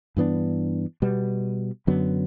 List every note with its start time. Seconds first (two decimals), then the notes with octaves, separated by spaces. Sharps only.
0.17 G2 E3 B3 D4
1.02 B2 G3 B3
1.87 F#2 D3 F#3 B3